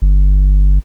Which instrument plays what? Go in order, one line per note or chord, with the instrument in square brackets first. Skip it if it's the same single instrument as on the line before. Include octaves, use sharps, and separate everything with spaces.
[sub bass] G1